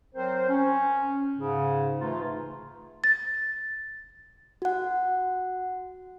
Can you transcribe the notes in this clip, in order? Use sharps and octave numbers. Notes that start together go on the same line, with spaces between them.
F#3 C4 A#4 C5
C#4
G#2 C#3
C3 E3 A3 D#4 F4
A6
F#4 F#5